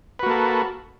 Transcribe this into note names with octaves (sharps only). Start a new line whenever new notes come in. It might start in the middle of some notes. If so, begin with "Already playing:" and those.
A#3 F#4 A4 B4